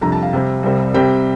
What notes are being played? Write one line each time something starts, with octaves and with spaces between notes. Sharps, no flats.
F2 C3 G3 D4 A#5
A5
F5
C3 G3 C4
C2 C3 G3 C4
C3 G3 C4 G5